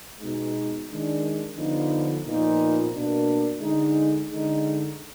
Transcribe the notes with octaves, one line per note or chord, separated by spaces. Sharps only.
B2 G#3 D#4
D#3 G#3 D4
D3 F3 B3 D#4
A#2 F3 B3 D#4
B2 A#3 D4
D3 G#3 D#4
D3 G#3 D#4